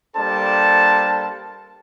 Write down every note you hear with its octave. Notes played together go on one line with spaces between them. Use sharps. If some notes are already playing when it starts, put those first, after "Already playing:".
G3 A#3 D4 A4 C5 A5